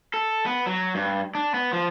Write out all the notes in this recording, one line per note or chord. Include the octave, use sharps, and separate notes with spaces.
A4
B3
F#3
G2
D4
B3
F3